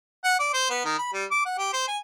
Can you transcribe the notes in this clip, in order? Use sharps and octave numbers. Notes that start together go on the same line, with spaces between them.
F#5
D5
C5
B3
D#3
B5
G3
D6
F#5
G4
C5
G#5